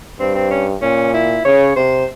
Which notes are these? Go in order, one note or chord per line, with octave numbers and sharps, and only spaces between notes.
G2 C4
C4
C#4
A#2 C#4
E4
C#3 C#5
C3 C5